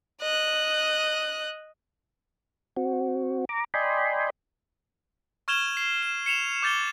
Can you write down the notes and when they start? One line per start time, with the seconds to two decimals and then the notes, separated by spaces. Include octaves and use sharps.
0.21 D#5 F#6
2.77 C4 F#4
3.49 A#5 D6
3.74 D5 D#5 G5 G#5 B5 C6
5.48 C#6 F6 G#6 E7 F7 G7
5.77 C7
6.03 E7
6.26 C#7 E7 F7
6.63 D6 G6 A6 E7 G7